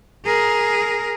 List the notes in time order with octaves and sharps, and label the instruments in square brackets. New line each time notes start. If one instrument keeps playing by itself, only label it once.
[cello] G#4 A#4